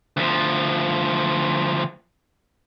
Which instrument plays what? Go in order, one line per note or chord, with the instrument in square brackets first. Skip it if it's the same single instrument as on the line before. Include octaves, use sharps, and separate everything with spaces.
[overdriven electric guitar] D2 F3